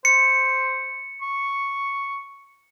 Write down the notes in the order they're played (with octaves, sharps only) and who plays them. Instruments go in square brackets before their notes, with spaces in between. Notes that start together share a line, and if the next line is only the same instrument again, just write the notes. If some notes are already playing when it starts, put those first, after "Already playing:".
[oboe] C5 [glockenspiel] C#7
[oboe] C#6